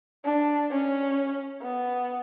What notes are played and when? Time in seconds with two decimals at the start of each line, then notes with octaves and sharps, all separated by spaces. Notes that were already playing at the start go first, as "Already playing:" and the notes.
0.25 D4
0.71 C#4
1.62 B3